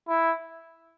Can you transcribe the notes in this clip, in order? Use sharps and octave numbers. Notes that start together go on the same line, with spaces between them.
E4